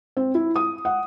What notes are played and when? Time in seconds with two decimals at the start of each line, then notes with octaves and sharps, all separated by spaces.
0.17 C4
0.35 E4
0.56 D#6
0.85 F#5